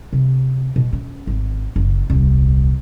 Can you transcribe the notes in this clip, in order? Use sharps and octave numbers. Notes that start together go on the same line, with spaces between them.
C3
B2
C#4
G#1
F#1
D#1 C2